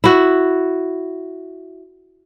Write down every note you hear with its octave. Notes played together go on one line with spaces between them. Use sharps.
E4 F#4